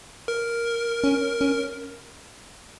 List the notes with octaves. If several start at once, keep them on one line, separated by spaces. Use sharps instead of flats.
A#4
C#4
C#4